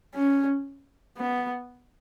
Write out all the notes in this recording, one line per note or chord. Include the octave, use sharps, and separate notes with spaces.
C#4
B3